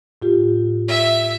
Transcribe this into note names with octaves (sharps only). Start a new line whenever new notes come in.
A2 F4 G4
E5